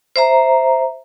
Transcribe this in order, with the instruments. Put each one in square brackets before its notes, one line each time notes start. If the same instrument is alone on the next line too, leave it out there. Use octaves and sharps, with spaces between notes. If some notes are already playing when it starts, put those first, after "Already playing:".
[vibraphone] C5 E5 A#5